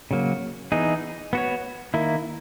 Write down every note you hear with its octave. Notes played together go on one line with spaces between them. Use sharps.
C#3 F#3 A#3
E3 B3 D#4 G#4
B3 F#4 C#5
D#3 A#3 E4